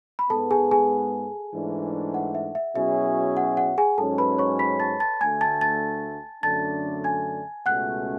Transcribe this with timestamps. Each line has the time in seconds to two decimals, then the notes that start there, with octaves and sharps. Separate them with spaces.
0.19 B5
0.30 G#2 G#3 B3 A4 A5
0.51 G#4 G#5
0.71 G#4 G#5
1.53 G#2 E3 A3 D4
2.14 F#5
2.35 E5
2.55 E5
2.75 B2 F#3 C#4 E4 G#4 E5
3.37 F#5
3.57 F#5
3.78 G#4 G#5
3.98 G#2 F#3 C#4 A4 A5
4.18 B4 B5
4.38 C#5 C#6
4.59 B5 B6
4.80 A5 A6
5.00 A5 A6
5.21 D2 D3 A3 G#5 G#6
5.41 A5 A6
5.61 A5 A6
6.43 F#2 D3 A3 D4 A5 A6
7.04 G#5 G#6
7.66 C#2 B2 A3 C#4 F#5 F#6